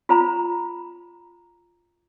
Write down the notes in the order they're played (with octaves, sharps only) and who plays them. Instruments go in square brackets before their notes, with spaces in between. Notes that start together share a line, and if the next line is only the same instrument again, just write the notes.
[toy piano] F4 C5 A#5 B5